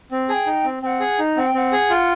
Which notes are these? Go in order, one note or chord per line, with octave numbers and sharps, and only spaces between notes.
C4
G#4 G5 A5
D#4
C4
C4 F#5 G5
G#4
D#4
C4 F#5
G5
C4 F#5
G#4
F4